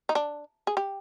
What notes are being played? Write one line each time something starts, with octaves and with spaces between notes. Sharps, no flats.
D#4
D4
G#4
G4